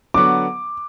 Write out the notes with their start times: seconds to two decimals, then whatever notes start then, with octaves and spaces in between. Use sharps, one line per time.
0.14 D3 F#3 B3 F#4 D6